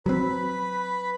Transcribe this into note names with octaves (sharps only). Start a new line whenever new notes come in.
F#3 C4 B4 B5